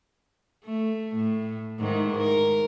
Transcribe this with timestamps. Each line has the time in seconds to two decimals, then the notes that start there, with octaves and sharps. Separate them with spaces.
0.65 A3
1.16 A2
1.80 G#2 D#3 E3
2.17 A#4